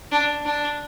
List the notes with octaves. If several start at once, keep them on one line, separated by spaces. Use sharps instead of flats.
D4
D4